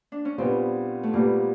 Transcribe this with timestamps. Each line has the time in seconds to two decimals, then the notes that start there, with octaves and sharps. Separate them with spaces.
0.12 D4
0.25 C#4
0.38 A#2 G3 B3 C4
1.03 A3
1.13 A#2 G3 A#3 B3